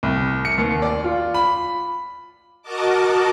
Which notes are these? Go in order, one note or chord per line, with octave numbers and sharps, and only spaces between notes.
C2
C#7
D#2
D5
F4
B5
F#4 A#4 D#5 A5 D6